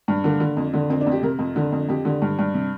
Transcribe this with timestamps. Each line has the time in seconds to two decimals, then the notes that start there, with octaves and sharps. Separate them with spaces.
0.08 G2
0.24 D3 A#3
0.40 D3
0.57 F2
0.74 D3
0.90 F2 C4
1.01 D4
1.06 F2
1.12 G4
1.23 C3 A#4
1.39 F2
1.56 D3
1.72 F2
1.89 F2 G4
2.05 D3
2.22 G2
2.39 G2
2.54 C3